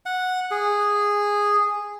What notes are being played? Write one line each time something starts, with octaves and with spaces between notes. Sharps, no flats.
F#5
G#4